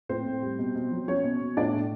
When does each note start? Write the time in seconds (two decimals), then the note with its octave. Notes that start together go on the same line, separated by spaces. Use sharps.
0.09 A2 C4 C5
0.26 A2
0.42 G3
0.59 B2
0.75 B2
0.92 F#3
1.08 F#3 C#4 C#5
1.24 B2
1.41 B2
1.57 A2 D4 D5
1.73 A2